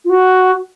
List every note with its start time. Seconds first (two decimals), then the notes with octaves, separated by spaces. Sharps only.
0.05 F4
0.10 F#4